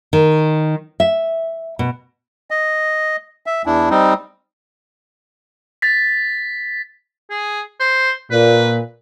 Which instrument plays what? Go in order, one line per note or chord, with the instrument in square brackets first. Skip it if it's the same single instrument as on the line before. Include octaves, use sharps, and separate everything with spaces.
[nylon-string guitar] D#3
E5
B2
[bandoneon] D#5
E5
E2 D4 E4
G3 C4 D#4
[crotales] A6 B6
[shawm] G#4
C5
[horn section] A#2 [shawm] B4